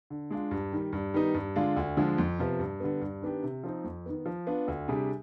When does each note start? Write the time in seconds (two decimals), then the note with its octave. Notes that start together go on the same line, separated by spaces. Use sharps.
0.10 D3
0.30 G#3 D4 F4
0.51 G2
0.73 D#3 G3
0.93 G2
1.14 D#3 G3 B3 D#4
1.35 G2
1.56 D3 G#3 D4 F4
1.76 D2
1.97 D3 F3 G#3
2.18 F2
2.39 C3 F3 B3
2.59 G2
2.80 D3 G3 B3
3.01 G2
3.22 D#3 B3 D4 G4
3.43 C3
3.63 F3 C4 D#4
3.84 F2
4.06 D#3 B3
4.26 F3
4.47 B3 D4 F4
4.68 D2
4.88 C3 G3 D4 G#4